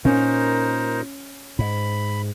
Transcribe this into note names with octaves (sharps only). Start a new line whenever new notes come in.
A#2 C#4 D#4 A#4 C5
G#2 B5